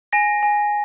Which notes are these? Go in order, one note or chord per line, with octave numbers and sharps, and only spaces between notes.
G#5 A#6
G#5